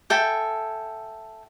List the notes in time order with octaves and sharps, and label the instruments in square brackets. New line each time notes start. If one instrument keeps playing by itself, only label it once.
[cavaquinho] A4 E5 G5 G#5